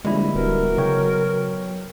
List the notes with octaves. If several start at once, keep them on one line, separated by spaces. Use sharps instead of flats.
A#1 D3 G3 G#3 E4
D1 B2 A#4
C#3 F#3 C#5 G5